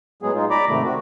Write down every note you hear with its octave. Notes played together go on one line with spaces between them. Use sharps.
A2 F#3 G#3 B3 G#4
G#3 D#4 F4
D5 A#5 B5 D6
G#2 C3 D#3 A3
C4 F#4